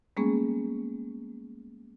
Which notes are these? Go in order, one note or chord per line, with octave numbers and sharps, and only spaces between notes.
G3 G#3 A#3 B3 C#4 G#4